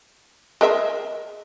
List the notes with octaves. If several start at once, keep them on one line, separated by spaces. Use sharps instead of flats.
G#3 A#4 E5